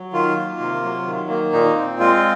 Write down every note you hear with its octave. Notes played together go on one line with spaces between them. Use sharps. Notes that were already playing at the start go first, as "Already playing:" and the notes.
Already playing: F#3
D#3 F4
A#3
C3
F#3
D#3
A#3
A#2 D#4
C4
G#3 F4